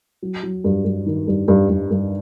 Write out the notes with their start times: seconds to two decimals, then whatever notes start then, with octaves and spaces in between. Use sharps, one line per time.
0.22 F#3
0.43 F#3
0.64 G2
0.85 G2
1.06 D#3
1.27 G2
1.48 G2
1.69 G2
1.91 G2